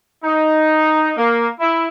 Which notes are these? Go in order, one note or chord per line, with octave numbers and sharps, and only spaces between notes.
D#4
A#3
E4